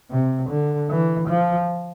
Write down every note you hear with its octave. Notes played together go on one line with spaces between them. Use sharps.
C3
D3
E3
F3